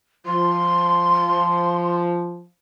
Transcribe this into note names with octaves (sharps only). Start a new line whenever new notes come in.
F3 C6